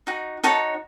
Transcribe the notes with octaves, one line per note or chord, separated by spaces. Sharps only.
D#4 F#4
D#4 F#4 C#5 A5